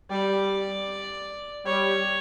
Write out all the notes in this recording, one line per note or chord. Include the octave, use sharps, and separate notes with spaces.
G3 D5
G3 C#5